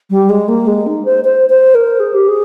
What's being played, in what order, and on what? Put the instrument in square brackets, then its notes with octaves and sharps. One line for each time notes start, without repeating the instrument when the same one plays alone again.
[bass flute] G3
G#3
A#3
G#3
D#4
C5
C5
C5
A#4
G#4
G4
G#4